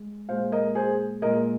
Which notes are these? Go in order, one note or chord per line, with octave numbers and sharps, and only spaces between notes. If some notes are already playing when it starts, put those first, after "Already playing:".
Already playing: G#3
A#2 G#3 C5 F5
A#4 D#5
G#4 C5
A#2 G#3 A#4 D#5